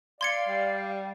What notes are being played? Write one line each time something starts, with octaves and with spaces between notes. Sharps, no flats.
D5 F5 C6 G#6 C#7
G3